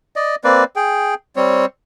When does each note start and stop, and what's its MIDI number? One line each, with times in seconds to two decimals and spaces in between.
0.16 0.35 74
0.16 0.35 75
0.44 0.64 58
0.44 0.64 60
0.44 0.64 71
0.44 0.64 74
0.76 1.15 68
0.76 1.15 79
1.36 1.65 55
1.36 1.65 60
1.36 1.65 73